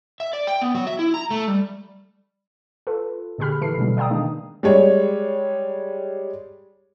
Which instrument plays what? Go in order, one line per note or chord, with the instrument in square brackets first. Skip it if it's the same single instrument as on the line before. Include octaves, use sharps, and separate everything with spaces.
[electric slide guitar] E5
D5
G5
B3
F#3
E5
E4
A#5
A3
G3
[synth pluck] F4 A4 B4
A#2 D3 G4 G#4 B5 F6
E3 A4 B4 C7
B2 D3 E3 F#3 G3
D5 F5 G5 A#5 D#6
D#3 G#3 A#3 D4 D#4
[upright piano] G3 G#3 C#5